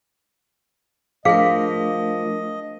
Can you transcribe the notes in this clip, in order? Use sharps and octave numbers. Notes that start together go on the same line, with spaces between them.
F3 A3 D4 G#4 A#4 D#5 F5